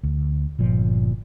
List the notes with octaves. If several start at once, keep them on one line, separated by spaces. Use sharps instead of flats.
D2
G1 A#2 F3